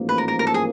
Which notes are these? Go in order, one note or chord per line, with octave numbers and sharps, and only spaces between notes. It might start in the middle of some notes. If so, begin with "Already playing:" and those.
Already playing: A1 G#2 F3 A#3
B4
A#4
A#4
A#4
A4
G#4